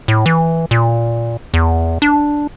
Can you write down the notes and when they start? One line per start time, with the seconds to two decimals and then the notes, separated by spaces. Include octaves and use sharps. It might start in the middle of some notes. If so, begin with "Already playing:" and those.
0.08 A2
0.26 E3
0.71 A#2
1.54 E2
2.02 D4